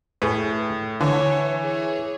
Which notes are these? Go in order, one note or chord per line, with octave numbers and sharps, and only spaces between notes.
A2 G#4 B4
D3 E3 C#5
G#4 C#5